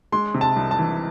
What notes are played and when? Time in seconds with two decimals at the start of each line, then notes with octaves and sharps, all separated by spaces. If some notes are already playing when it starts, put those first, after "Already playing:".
0.12 G#3 C6
0.34 C3
0.41 A5
0.56 C2
0.71 A5
0.79 E3